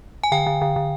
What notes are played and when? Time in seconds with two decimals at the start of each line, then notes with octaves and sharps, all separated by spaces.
0.24 G#5
0.32 D3 G5
0.47 D3
0.62 D3
0.76 D3